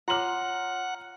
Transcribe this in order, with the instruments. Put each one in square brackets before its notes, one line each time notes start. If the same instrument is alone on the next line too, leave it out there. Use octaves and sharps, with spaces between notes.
[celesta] F4 C#5 D6 [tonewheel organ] F#5 [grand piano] A#5 F#7 [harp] C6 F6